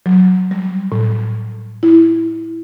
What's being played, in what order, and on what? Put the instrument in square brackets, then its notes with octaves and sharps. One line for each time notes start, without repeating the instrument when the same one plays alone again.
[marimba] F#3
G3
A2
E4